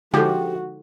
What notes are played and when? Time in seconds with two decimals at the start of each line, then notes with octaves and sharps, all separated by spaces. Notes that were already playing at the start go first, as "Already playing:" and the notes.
0.14 D3 F3 G#3 D#4 F#4 G4 A4